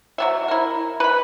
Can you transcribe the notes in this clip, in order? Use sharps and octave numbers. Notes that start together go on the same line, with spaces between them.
F#3 B3 E5
E4 A#4
B4 B5